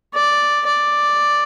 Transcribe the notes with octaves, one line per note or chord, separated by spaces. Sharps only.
D5
D5